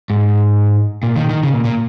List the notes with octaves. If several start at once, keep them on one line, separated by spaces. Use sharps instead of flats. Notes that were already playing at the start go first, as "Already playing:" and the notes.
G#2
A#2
D#3
D#3
C#3
A#2
A#2